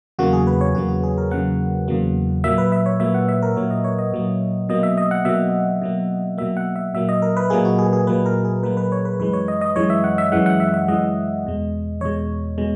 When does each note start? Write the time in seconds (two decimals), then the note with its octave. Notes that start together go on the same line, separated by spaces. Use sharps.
0.19 E2 C#3 F#3 A#3 F#4
0.33 G#4
0.47 B4
0.61 C#5
0.75 E2 C#3 F#3 A#3 F#4
0.88 F#4
1.04 G#4
1.18 A#4
1.31 E2 C#3 F#3 A#3 F#5
1.88 E2 C#3 F#3 A#3
2.44 A#2 F#3 A#3 E5
2.58 B4
2.72 E5
2.86 C#5
3.00 A#2 F#3 A#3 E5
3.14 F#5
3.28 E5
3.42 A#4
3.56 A#2 F#3 A#3 C#5
3.71 D#5
3.84 C#5
3.98 D#5
4.13 A#2 F#3 A#3
4.69 B2 F#3 A#3 D#5
4.83 E5
4.98 D#5
5.11 F#5
5.25 B2 F#3 A#3 E5
5.82 B2 F#3 A#3
6.38 B2 F#3 A#3 E5
6.57 F#5
6.76 E5
6.94 A#2 F#3 A#3 E5
7.09 D#5
7.22 A#4
7.37 B4
7.50 A#2 F#3 A#3 G#4
7.65 F#4
7.79 G#4
7.93 G#4
8.07 A#2 F#3 A#3 B4
8.26 A#4
8.45 G#4
8.63 A#2 F#3 A#3 B4
8.77 B4
8.92 C#5
9.05 B4
9.20 F#2 E3 G#3 B4
9.33 C#5
9.48 D#5
9.61 D#5
9.76 F#2 E3 G#3 C#5
9.90 E5
10.04 F#5
10.18 E5
10.32 F#2 E3 G#3 F#5
10.46 F#5
10.60 E5
10.74 E5
10.88 F#2 E3 G#3 D#5
11.45 E2 B2 G#3
12.01 E2 B2 G#3 C#5
12.58 B2 G#3